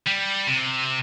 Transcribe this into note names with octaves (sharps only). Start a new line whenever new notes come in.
G3
C3